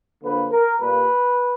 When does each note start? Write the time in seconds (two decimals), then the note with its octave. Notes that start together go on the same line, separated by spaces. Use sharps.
0.23 D3 F3 A#3 B4
0.52 A#4
0.80 A#2 G3 A#3 B4